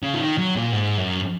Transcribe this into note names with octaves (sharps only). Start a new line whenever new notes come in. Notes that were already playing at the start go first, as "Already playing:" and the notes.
C#3
F3
D#3
F#3
A#2
G#2
F#2